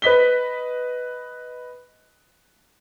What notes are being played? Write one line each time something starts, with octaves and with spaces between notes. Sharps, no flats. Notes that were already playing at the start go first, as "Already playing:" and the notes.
B4 D#5 B6 G7